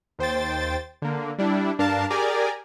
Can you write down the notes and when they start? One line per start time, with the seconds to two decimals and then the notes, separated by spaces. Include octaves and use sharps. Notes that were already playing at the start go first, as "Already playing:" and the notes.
0.19 D#2 C5 G5 A6
1.02 D3 A#3
1.38 G3 D4 E4
1.78 G2 D4 A#4 F5 A5
2.10 G4 G#4 A#4 D5 G#5 A#5